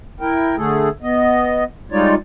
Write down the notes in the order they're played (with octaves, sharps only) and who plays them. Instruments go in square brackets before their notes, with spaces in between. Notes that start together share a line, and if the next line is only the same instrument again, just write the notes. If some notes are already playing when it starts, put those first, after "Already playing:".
[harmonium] E4 A#4 G5
D3 A3 G#4 A4
B3 D#5
G3 G#3 D#4 F4 C#5 D5